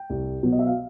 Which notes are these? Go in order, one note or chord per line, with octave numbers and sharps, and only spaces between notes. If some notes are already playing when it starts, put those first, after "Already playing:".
Already playing: G5
C2
B2 F#3 B3
D#5
E5
F5